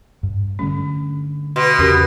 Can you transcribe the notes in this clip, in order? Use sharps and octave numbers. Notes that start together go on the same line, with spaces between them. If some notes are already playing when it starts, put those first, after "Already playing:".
G2
D3 G3 A3 C#4
B2 C6
E2 C#3 C#4 G4 A#4